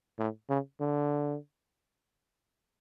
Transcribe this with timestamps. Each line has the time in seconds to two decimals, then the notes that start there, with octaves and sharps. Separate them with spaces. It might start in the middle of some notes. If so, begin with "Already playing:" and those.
0.19 A2
0.50 C#3
0.80 D3